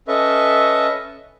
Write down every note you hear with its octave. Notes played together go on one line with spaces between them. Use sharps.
C#4 A4 B4 D#5 E5 C#6